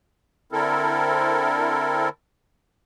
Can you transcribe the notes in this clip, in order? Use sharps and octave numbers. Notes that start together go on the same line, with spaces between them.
D3 C4 E4 A4 A#4